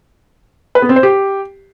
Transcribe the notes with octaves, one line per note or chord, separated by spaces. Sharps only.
B4
B3
C4
C5
G4